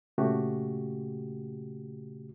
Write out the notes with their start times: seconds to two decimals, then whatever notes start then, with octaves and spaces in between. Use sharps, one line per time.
0.18 A#2 C#3 A3 F#4 G4